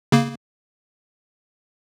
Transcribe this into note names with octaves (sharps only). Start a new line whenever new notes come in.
C#3 A#3